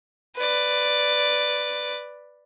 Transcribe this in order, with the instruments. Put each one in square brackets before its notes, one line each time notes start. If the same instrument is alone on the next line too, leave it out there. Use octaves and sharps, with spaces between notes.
[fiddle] B4 D5